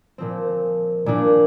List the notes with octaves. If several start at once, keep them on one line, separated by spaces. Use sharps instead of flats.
A#2 F3 C4
A#2 F3 A#3 D4